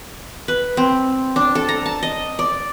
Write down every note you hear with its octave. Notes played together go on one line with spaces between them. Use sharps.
B4
C4
D4
A4
A#5
A5
D#5
D5